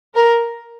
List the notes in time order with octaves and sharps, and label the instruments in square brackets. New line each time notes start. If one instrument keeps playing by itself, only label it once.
[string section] A#4